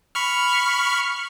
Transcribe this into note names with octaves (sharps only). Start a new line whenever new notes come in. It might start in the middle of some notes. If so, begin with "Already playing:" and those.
B5 C#6 F6